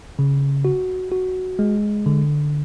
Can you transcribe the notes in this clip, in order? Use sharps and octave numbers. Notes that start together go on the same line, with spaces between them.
C#3
F#4
F#4
G#3
D3